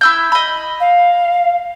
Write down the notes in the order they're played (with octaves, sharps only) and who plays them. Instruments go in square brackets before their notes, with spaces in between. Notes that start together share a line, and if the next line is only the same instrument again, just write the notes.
[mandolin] E4 E6 G6
D#5 B5
[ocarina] F5